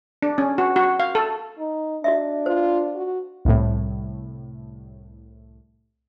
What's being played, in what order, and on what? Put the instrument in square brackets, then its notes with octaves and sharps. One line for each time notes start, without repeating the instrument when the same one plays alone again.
[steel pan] D4
C#4
F#4
F#4
F5
A4
[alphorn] D#4
[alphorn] D4 [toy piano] F#4 D#5 E5
[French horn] F4 [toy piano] C5
[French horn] F#4
[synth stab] C2 A2